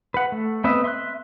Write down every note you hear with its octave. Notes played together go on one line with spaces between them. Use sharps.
B4 F#5
A3
B3 C4 B4 D#5 E5
E5 C6 C#6 F#6